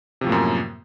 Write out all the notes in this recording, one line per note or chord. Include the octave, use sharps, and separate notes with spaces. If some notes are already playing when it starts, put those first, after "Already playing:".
F#2 A2 C3 F3 A#3